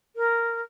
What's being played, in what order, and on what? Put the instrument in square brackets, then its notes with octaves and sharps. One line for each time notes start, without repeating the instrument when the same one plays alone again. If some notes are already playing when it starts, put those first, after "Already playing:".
[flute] A#4